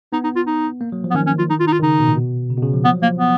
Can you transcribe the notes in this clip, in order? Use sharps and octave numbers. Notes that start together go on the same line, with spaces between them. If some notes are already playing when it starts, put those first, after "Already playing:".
B3 D#4
D#4
F4
D#4
A#3
F#3
F3
B3
D#3 C#4
C#4
F4
D#4
F4
D#4
F4
D#3
C#3 D#4
B2
A#2
B2
C#3
B2
C#3
F3
F3 B3
F#3
F3 A#3
B3